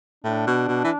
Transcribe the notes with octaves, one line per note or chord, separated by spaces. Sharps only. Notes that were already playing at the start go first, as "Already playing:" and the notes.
A2 D4
B2
B2
E3